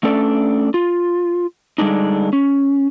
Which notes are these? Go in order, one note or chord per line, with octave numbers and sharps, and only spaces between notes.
A3 C#4 D4 A4 D5
F4
D3 G3 G#3 D4 D#4
C#4